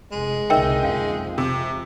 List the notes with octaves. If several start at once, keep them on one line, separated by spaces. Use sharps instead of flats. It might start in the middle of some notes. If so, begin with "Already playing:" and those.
F1 G#3
F#1 C2 D3 D#4 A#4 E5 G5
F2 F3 C#4 F5
C3